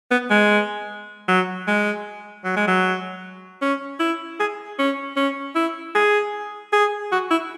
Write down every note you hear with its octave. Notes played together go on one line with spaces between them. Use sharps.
B3
G#3
F#3
G#3
F#3
G#3
F#3
C#4
E4
G#4
C#4
C#4
E4
G#4
G#4
F#4
E4